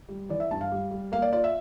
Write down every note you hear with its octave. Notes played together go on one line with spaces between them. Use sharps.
G3
E3 D5
E5
G2 A5
F5
G3
G3
A#3 F5
D5
F4 D5
E5